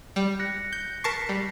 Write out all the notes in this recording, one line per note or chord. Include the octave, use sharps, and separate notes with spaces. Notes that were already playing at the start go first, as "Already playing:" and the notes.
G3
F#6 A#6 C#7
G6
A#4 A5 C#6 B6 C7
G3